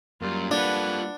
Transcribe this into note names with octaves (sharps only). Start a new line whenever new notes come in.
F#2 G3 A#3 F4
D4 F4 A4 B4 F#5